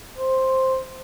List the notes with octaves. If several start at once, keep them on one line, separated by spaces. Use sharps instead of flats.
C5